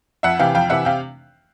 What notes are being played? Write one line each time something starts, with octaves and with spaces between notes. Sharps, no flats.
F2 E5 F#5
C3 E3 F5 G5
F2 F5 G5
C3 E3 E5 F#5
C3 F5 G5